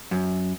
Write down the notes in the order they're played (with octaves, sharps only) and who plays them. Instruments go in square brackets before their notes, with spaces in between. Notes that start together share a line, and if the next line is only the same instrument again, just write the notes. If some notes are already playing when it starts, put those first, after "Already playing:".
[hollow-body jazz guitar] F#2